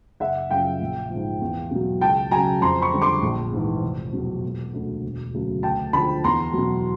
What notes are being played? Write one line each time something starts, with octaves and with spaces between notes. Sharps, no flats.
F#1 E5 F#5
F#2 C#3 F3 F5 G5
A#1
G#2 F3
E2
B2 F#3
C#2 G5 A5
C#3 F#3 G#5 A#5
F2 A#5 C6
B5 C#6
D3 G3
C6 D6
A#1
G#2 E3
F1
E2 B2 F#3
E1
D2 D3
E1
D2 C#3 F#3
D2 G5 A5
D3 F3 A5 B5
E2 A#5 C6
B2 F#3